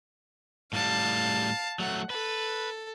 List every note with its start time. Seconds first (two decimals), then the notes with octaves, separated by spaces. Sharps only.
0.73 A2 G3 F5 A5
1.79 F#3 A3 F#5
2.10 A4 B4